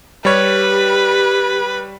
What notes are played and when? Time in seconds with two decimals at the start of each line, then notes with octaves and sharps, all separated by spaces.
0.25 G3 G4 B4 C#5